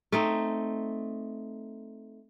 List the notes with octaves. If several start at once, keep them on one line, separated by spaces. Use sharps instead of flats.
A3 C4 D#4